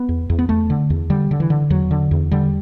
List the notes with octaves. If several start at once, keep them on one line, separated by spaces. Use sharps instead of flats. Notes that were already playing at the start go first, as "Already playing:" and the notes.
Already playing: B3
E2
E2
B3
E2 A3
D3
E2
D3 G3
D3
E3
D3
E2 F#3
D3
E2
D3 G3